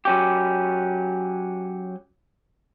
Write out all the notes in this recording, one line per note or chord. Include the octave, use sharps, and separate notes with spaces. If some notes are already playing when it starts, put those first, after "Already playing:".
F#3 C#4 G4